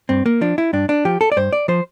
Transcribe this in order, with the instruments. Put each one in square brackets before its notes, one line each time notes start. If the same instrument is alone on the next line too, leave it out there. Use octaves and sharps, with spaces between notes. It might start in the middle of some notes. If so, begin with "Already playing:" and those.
[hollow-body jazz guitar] G2 C4
A#3
F3 D4
E4
G2 D4
D4
F3 G4
A4
D5
G2 C5
D5
F3 C5